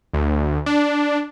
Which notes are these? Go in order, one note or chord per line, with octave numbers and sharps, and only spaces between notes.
D2
D4